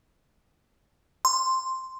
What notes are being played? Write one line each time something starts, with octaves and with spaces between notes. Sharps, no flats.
C6